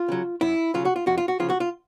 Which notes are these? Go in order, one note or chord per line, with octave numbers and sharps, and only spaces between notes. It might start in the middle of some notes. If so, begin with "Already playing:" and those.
Already playing: F4
C#3 F#3
F#2 E4
C#3 F#3 F4
F#4
F4
F2 F#4
F4
F#4
C#3 F3 F4
F#4
F4